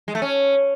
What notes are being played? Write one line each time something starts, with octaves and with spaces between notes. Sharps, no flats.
G#3
A3
C#4